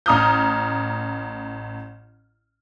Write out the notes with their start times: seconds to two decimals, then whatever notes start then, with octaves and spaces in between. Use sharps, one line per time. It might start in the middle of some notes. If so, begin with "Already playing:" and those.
0.06 A1 A#5 D#6 F6 G6